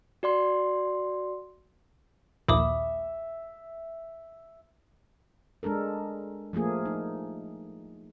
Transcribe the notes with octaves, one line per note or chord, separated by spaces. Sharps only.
F#4 D5 C6
A#1 D#2 A#2 E5 B5 D6 D#6
G#3 D4 A4 A#4
F3 A3 A#3 G#4
D#4